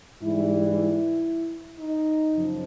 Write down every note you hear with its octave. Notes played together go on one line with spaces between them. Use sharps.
G#2 E3 G3 E4
E4
D#4
F#2 C#3 F3